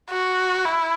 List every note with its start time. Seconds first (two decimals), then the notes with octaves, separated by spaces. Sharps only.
0.10 F#4
0.65 E4